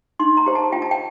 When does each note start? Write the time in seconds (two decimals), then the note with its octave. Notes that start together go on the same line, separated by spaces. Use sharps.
0.20 D#4 C6
0.37 A#5
0.46 G4 C5
0.55 A5
0.72 F4 G5
0.82 A5
0.91 G5